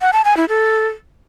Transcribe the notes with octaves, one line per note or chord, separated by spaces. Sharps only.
F#5
A5
G#5
E4
A4